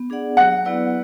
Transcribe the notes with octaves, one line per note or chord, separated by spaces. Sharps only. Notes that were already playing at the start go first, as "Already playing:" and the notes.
Already playing: B3
D4 G#4 D5 F#5
F#3 F#5
B3 E4 B4 D5